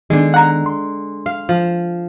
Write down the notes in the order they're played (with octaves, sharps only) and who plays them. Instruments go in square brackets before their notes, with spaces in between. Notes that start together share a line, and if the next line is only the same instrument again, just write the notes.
[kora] D3 G#3 [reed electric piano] D#3 B3
[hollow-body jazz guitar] F#5 A#5
[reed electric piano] C6
[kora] F5
F3